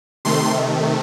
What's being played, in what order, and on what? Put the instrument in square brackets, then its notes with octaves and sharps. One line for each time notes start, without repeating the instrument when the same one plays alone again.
[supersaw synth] C3 D#3 A3 C6